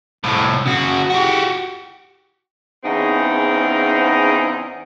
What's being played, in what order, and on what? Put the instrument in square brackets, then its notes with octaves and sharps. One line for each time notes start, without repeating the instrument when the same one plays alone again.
[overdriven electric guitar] C2 A2
C#3 F#4
F#4 G4
[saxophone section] E2 C#3 C4 D#4